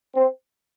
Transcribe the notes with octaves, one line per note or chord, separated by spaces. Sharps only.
C4